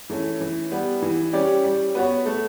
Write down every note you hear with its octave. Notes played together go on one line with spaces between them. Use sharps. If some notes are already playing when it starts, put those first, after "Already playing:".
E3 A3 C#4
E3
G3 B3
E3
G3 C#4 G4 D5
G3
B3 F#4 C#5
A3